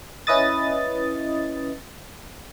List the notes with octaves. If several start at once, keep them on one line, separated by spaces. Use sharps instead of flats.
C#4 E4 B4 D#5 D#6 A6